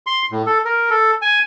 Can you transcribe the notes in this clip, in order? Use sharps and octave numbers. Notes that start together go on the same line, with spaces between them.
C6
A2
A4
A#4
A4
G#5